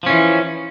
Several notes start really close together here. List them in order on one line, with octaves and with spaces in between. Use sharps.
F3 C#4 E3